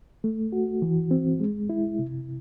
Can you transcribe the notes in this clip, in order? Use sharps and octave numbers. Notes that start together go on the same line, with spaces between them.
A3
F#4
E3
C4
G#3
E4
C3